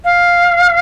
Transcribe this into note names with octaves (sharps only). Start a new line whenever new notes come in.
F5